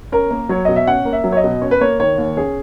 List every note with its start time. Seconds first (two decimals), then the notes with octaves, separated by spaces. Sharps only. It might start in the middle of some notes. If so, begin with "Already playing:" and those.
0.12 C#4 A#4
0.31 A#3
0.49 F#3 C#5
0.65 B2 D#5
0.76 E5
0.87 C#4 F#5
1.05 A#3
1.13 E5
1.24 F#3
1.32 C#5
1.37 D#5
1.44 B2
1.62 C#4 C#5
1.71 B4
1.81 A#3 C#5
2.00 D#3 C#5
2.18 D#2
2.37 C#4 G#4